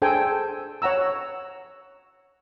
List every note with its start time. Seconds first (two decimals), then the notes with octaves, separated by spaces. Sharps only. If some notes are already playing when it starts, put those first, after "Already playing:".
0.02 D4 G#4 A4 C5 G5 G#5
0.82 C#5 F#5 A#5 E6